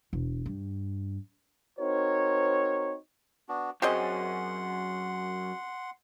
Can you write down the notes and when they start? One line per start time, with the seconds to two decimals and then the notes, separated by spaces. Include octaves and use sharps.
0.13 E1
0.46 G2
1.79 C4 D#4 F#4 A#4 C5 C#5
3.49 B3 D4 F#4
3.82 F#2 C4 G#4 D#5 F#5 C6